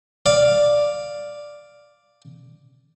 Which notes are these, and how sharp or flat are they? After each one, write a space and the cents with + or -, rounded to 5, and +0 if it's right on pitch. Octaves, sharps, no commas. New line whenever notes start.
D5 +0 F5 +0